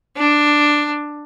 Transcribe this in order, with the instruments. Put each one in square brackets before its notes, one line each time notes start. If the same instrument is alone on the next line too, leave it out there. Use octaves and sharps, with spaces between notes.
[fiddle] D4